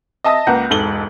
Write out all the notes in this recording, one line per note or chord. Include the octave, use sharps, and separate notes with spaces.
D#5 E5 A5 D#6 A#6
C#2 A#3 B4 F#5 G6
E1 G#2 A4 F#7 G7